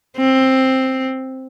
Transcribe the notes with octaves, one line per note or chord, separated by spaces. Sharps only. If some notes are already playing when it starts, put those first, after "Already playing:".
C4